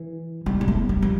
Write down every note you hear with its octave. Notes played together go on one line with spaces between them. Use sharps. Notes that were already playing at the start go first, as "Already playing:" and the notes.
Already playing: E3
G3
G3
A3
G3
F3